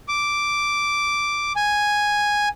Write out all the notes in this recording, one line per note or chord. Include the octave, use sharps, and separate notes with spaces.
D6
G#5